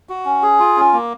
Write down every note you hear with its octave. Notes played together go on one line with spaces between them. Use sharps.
F#4
C#4
G#4
F4
C#4
A#3